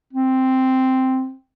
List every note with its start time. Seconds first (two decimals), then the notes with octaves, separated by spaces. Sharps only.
0.13 C4